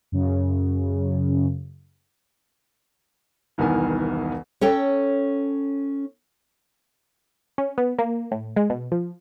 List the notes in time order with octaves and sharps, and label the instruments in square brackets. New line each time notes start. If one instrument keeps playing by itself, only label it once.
[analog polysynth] F#2 C#3
[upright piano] E1 C2 D#3 B3 A#4 G#5
[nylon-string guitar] C#4 A4 C#5 G5
[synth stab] C#4
B3
A#3
A2
G#3
B2
F3